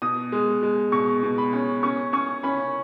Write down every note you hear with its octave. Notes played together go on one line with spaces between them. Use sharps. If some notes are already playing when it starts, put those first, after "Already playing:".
B2 D#6
G#3
G#3
B2 C#6
B2
B5
C#4
C#4 C#6
C#4 C#6
C#4 B5